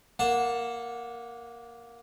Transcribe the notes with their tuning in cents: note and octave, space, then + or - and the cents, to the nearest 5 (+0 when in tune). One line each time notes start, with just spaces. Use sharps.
A#3 +0 F#5 -20 A5 +0